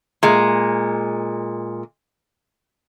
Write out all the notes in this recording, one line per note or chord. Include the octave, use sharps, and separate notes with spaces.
A#2 G#3